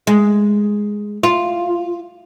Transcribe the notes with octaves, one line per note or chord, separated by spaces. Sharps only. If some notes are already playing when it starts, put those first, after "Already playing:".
G#3
F4